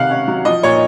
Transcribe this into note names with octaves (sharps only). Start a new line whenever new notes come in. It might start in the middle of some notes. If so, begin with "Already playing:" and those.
Already playing: C3 D#3 F5 F#5
C#4
F#3
F3 D#5
A#2 C#5